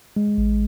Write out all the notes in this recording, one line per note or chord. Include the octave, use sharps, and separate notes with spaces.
G#3
A1